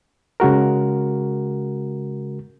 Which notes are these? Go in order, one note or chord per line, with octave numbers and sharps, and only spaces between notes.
C#3 G#3 F#4 A#4